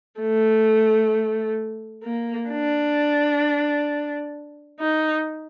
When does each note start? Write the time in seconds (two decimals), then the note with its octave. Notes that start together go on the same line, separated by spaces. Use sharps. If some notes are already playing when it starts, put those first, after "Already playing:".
0.21 A3
2.03 A#3
2.50 D4
4.79 D#4